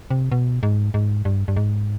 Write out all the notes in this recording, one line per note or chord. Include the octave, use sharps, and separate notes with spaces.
C3
B2
G#2
G#2
G2
G2
G#2